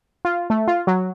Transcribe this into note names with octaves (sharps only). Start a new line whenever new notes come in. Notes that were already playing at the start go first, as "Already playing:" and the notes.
F4
A3
F4
F#3